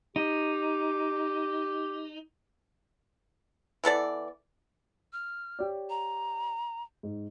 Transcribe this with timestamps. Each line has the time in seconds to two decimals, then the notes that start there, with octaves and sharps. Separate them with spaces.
0.16 D#4 G4
3.84 E3 B3 A4 D5
5.13 F6
5.59 G4 C#5 D5
5.90 A#5
7.03 G#2